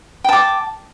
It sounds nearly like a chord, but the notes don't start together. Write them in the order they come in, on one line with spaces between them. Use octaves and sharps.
G5 A5 D6